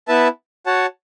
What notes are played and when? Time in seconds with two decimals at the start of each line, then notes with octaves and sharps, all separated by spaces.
0.08 B3 E4 B4 E5 A5
0.66 F#4 C#5 F#5 A5